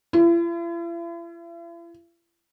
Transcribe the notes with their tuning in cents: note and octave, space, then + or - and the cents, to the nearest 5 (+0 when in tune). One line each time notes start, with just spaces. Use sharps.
E4 +45